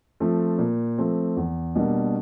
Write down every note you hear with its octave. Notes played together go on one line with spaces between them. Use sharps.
F3 A3 C4
A#2
F3 A3 C4
E2
B2 G3 A#3 D4